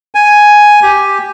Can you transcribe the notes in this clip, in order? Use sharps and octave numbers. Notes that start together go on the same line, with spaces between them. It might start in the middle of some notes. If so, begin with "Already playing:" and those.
G#5
G4